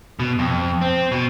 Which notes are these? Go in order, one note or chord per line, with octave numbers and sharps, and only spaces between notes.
B2
F2
C4
B2